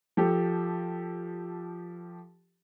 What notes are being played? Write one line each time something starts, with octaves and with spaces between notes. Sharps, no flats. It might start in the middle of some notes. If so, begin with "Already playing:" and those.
F3 G4 A4